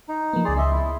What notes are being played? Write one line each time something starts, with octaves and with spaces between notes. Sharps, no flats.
D#4
F3 A#3 B3
C#2 G#4 D5 C6
D#5 E5
E4